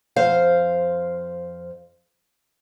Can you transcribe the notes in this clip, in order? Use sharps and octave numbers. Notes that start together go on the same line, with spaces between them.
F2 C5 F5